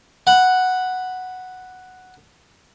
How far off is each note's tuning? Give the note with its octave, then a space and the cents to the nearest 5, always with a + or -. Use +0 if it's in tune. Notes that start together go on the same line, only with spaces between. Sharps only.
F#5 +0 B5 +0